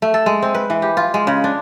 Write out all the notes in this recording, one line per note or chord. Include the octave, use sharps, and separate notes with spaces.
A3
A4
G#3
C4
B4
E3
G4
F4
G#3
C#3
D4